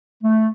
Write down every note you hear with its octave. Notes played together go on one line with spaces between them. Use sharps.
A3